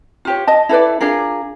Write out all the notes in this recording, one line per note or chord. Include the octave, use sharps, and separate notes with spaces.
F4 G4 C#5
D#5 A5
E4 A4 B4 D5
D4 F4 G#4 A#4